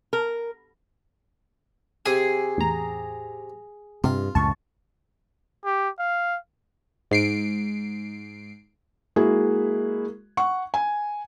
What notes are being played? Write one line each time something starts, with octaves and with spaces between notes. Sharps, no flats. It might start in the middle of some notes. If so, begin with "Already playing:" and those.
A#4
C3 G#4 G#5
E2 A2 A#5
G2 C3 F4
C#2 F#2 A2 A5 C#6
G4
F5
G#2 C7 D7
G#3 A#3 E4 F#4 G#4
F#5 C#6
G#5